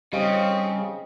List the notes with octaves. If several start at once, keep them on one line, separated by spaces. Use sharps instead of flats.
C#3 G3 C4 D#5 F5